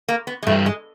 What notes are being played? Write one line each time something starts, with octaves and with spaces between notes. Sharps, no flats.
A#3
B3
G#3
G2 E3 G3 A3
G#3